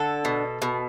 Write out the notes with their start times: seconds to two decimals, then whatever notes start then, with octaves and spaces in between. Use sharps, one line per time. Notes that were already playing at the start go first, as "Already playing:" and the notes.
Already playing: D3 A4
0.25 B2
0.62 B2